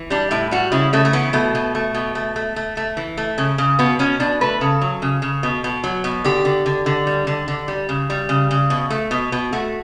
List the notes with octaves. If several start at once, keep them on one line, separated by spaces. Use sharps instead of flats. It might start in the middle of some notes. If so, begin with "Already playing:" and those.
Already playing: E3
G3 D4
A2 E4
G3 F#4
C#3 E4
C#3 A3
A3
E3 B3
B2 A3
B2
A3
B2
A3
A3
A3
A3
E3
A3
C#3
C#3
B2 B3
B2 C#4
B2 D4
A3 B4
C#3 A4
F#3
C#3
C#3
B2
B2
F#3
B2
D3 G4
D3
D3
D3
G3
D3
D3
G3
C#3
G3
C#3
C#3
B2
A3
B2
B2
A3 F#4